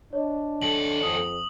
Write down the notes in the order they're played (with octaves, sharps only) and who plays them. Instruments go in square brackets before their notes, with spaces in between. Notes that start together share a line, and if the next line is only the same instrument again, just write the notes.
[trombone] D4 [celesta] C#5 D#5
[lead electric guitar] D#2 A4 [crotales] F#7
[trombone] F2 [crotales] D#6